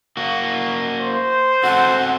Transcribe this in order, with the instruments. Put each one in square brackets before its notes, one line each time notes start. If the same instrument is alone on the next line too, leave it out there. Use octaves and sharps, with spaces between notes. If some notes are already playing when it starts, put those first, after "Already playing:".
[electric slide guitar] A#3 F#4
[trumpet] C5
[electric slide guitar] C4 F#4 A4 [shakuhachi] F#5